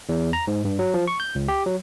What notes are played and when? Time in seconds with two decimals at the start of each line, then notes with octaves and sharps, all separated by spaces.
0.09 E2
0.33 A#5
0.47 G#2
0.65 G2
0.79 F#3
0.94 F3
1.08 C#6
1.20 G6
1.35 C#2
1.48 G4
1.66 F#3